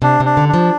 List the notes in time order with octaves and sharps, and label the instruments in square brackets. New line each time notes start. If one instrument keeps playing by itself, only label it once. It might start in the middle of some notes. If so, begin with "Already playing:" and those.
[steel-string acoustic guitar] C3 [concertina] D4
[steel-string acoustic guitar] C3
[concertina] D4
[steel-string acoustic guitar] D3
[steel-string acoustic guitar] F3 [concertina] D4